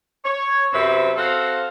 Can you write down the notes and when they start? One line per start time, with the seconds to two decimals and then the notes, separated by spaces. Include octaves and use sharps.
0.24 C#5
0.72 F#2 C3 C4 B4 C5 E5
1.16 C4 F#4 A4 C5 F5